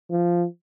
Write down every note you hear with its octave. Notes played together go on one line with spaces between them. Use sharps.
F3